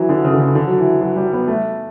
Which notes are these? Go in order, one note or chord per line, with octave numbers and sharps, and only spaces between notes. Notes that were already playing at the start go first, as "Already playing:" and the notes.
Already playing: E3 F#3
D3
C#3
D3
C#3
D3
F#3
E3
F#3
G3
B3
A3